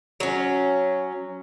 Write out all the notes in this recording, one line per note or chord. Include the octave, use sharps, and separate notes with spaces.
F#3 C#4